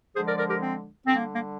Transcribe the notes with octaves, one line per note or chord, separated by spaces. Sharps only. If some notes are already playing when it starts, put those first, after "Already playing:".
D3 F3 G#3 G#4 C5
A#4 D5
A#4 D5
G4 A#4
C4
D3 G3 C4
A#3
A#3